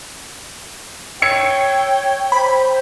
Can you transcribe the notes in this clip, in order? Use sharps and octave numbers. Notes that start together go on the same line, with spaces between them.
C#5 G5 E6 G#6 C#7
C5 B5